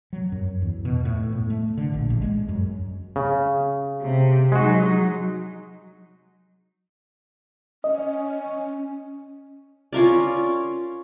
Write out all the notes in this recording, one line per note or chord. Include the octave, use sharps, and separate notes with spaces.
F#3
F#2
E2
B2
A2
A2
A3
D3
A#1
A1
G#3
F#2
C#3
C3
F#3 G#3 D#4 F#4
C#4 D#5
C#4 F4 A#4 D5